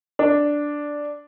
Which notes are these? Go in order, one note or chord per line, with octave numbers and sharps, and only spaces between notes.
D4